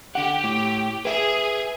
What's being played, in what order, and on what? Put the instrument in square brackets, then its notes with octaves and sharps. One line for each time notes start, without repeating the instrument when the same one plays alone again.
[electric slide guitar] D3 F#5 [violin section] G4
[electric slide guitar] A2
[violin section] G#4 [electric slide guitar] B4 E5